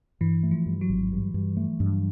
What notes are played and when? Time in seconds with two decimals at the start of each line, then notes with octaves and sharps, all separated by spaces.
0.21 G2 E3
0.43 A3
0.51 F3
0.66 G2
0.81 F#3
0.89 G#1
1.12 G2
1.34 G2
1.57 A3
1.80 G2